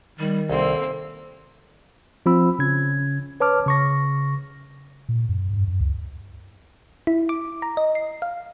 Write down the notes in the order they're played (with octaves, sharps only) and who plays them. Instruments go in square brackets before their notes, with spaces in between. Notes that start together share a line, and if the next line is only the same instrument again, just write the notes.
[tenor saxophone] D#3 [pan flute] G3
[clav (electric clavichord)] C2 [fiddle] A#3 C4 [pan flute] A4
[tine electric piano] F3 C4 F4 B5 E6
C#3 C#4 G#6
B4 C#5 A5 D6 F6
C#3 C#6 A#6
[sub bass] A#2
F#2
G2
F#2
C#2
[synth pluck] E4
D6
A#5
D#5
C7
F5